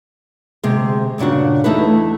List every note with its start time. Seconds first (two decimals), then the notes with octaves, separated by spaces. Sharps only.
0.63 D2 C3 G#3
1.18 G2 A#2 C#3 D4 F#4
1.64 E2 A3 D#4 E4 B4